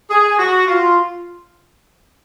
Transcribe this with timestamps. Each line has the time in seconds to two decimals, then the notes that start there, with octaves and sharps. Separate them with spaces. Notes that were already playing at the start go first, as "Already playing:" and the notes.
0.10 G#4
0.39 F#4
0.67 F4